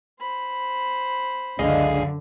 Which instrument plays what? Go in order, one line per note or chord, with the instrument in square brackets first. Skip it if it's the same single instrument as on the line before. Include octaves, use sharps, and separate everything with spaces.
[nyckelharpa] C5 B5
[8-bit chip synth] C#2 G#4 C7 [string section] F#2 D3 [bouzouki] D#5 F5